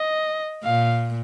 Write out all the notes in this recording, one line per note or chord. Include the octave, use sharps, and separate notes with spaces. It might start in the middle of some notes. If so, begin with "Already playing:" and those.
Already playing: D#5
A#2 F5